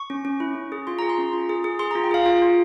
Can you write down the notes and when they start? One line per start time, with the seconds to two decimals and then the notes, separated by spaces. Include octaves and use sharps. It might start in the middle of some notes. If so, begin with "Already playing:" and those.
Already playing: C#6
0.10 C#4
0.25 C#4
0.40 E4
0.55 C#4
0.72 G#4
0.87 F4 C6
0.99 G#4 A#5
1.09 C6
1.18 C#4
1.33 F4
1.49 G#4
1.64 G#4
1.79 G#4 C6
1.91 F4 A#5
2.04 G5
2.11 G#4 F5
2.26 F4
2.42 F4